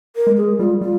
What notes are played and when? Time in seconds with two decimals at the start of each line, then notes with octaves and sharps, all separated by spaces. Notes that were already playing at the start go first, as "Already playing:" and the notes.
0.16 A#4
0.27 G#3
0.37 G#4
0.59 G3 F4
0.81 G3 F4